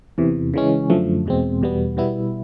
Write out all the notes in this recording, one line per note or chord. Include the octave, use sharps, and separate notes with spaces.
E2 C3 E3
C#3 E3 G#3 C#4
F#2 D3 F3 A3
E2 B2 G#3 C4
E2 B2 G3 B3
B2 G3 B3 E4